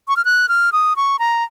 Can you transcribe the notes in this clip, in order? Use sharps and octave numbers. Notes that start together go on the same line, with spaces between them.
C#6
F6
F#6
F6
D#6
C#6
A#5